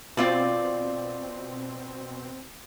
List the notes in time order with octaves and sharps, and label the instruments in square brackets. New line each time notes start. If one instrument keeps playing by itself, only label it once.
[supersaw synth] B2 C4 [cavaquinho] F4 D5